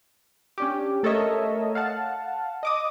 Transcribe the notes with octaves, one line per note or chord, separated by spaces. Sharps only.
C#4 D4 G4
A3 A4 A#4 C#5 D#5 E5
F5 F#5 A5
D#5 D6 D#6